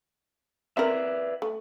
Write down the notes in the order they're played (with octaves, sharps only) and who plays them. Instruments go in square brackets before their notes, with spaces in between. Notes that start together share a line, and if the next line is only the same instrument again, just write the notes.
[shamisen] C4 E4 A#4 [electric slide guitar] B4 D5 E5
[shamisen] A3